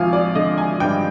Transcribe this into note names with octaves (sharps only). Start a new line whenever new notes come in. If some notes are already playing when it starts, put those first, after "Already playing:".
Already playing: G#1 F3 F5 G#5
D5
D3 D#5
G#5
G2 G5